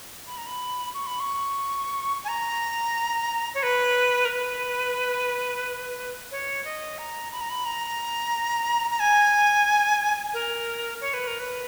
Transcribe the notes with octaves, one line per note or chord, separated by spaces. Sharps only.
B5
A#5
B5
C#6
B5
C#6
G#5
A#5
C#5
B4
A#4
B4
C#5
D#5
A#5
B5
A#5
B5
A#5
A#5
G#5
A#4
C#5
B4
A#4
B4